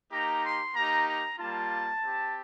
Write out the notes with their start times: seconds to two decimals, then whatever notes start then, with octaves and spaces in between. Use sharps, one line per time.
0.11 A#3 D#4 G4 A#5
0.43 C6
0.75 A#3 D#4 G4 A#5
1.07 A#5
1.39 G3 A#3 F4 A5
2.03 C4 G4